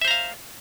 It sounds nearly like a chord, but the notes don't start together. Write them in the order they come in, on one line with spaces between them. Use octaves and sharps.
E5 C5 A#5 F5